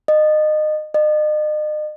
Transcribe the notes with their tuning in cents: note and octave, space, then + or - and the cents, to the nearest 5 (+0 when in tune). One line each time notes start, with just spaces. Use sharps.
D#5 -25
D#5 -40